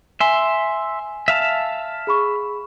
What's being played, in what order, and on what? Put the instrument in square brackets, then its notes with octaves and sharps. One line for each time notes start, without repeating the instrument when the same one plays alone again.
[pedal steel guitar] E5 C6 [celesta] G#5
[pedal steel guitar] E5 F5 A5
[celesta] G#4 B5 C#6